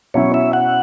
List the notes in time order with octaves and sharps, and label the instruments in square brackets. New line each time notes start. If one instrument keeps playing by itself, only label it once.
[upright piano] B2 F#3 C#4 E4 [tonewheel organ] C#5
[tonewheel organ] E5
F#5